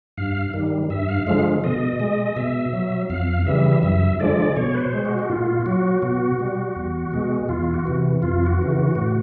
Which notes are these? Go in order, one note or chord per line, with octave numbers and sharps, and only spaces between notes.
G2 F5
D#3 G3
G2 E5
F5
D3 F3 G#3 F5
B2 D#5
G#3 D#5
D#5
B2 E5
F#3
F2 F5
C#3 E3 G3 E5
F#2 E5
D3 F3 G#3 D5
B2 C#5
B4
C5
G#3
F#4
F#4
A#2 F4
F#3 F#4
B2 F#4
G3
E2
B2 G#3
E2 F4
F#4
C3 E3
F2 F4
F#4
C#3 E3
F#4
A2 F#4